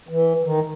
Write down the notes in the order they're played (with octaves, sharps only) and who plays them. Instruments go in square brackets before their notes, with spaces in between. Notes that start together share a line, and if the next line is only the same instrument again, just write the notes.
[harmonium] E3
D#3